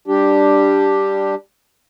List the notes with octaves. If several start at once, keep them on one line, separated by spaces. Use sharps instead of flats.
G3 D4 G4